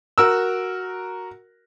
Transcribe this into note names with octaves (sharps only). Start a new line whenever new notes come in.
F#4 A#4 E6